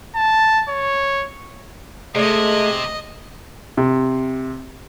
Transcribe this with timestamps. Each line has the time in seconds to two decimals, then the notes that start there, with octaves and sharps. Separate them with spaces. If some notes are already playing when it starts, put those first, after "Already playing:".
0.16 A5
0.69 C#5
2.15 C3 G#3 A3 D#5
3.77 C3